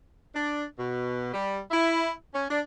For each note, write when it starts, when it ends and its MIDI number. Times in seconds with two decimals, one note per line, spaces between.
0.34 0.64 62
0.78 1.32 47
1.33 1.58 55
1.71 2.11 64
2.34 2.46 61
2.49 2.59 62